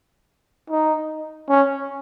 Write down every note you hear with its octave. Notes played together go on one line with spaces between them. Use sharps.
D#4
C#4